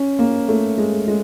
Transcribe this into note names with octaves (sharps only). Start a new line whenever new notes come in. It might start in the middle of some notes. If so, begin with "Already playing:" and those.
Already playing: C#4
A#3
A3
G#3
G#3